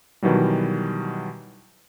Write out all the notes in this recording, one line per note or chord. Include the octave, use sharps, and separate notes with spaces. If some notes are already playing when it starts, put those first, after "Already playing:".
B2 D#3 E3 F#3 G3